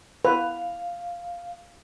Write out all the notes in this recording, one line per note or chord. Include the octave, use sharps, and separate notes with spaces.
B4 F5